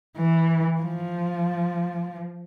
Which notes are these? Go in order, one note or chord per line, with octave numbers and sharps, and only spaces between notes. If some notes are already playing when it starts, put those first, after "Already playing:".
E3
F3